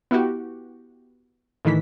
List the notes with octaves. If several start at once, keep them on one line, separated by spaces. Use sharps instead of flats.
B3 E4 F#4 G4
A2 D#3 E3 B6